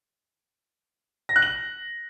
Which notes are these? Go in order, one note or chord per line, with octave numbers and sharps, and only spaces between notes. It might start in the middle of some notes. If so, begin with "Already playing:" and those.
A#6
F#6
F#7